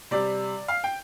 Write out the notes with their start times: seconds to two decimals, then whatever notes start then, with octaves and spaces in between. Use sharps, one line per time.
0.11 C3 G3 D5
0.68 F5
0.84 G5